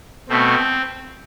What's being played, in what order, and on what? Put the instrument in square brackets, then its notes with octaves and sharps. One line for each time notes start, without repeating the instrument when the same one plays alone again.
[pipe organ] B2 A3 C4